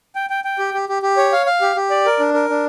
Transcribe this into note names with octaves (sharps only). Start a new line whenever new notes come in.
G5
G5
G5
G4
G4
G4
G4
C#5
F5
F5
G4
G4
D5
A#4
D4
A#4
D4